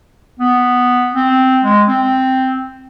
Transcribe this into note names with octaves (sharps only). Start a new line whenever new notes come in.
B3
C4
G#3
C4